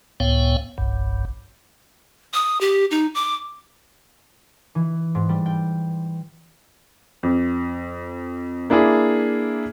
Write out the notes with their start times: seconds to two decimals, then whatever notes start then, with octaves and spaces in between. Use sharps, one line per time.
0.20 C#2 A2 B3 C#5 F5 G5
0.78 F#1 B1 G2
2.34 D#6
2.61 G4
2.91 D#4
3.15 D6
4.75 E3
5.15 G#2
5.29 G3
5.46 G5
7.23 F2
8.70 A#3 D4 E4 G#4